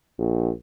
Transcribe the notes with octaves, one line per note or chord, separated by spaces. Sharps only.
A#1